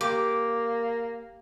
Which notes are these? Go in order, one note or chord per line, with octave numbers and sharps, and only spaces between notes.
A#3 G4 D6